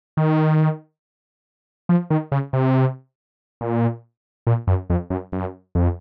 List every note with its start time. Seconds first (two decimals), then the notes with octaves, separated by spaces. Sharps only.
0.17 D#3
1.89 F3
2.10 D#3
2.32 C#3
2.53 C3
3.61 A#2
4.47 A#2
4.67 F#2
4.90 F2
5.10 F#2
5.32 F#2
5.75 F2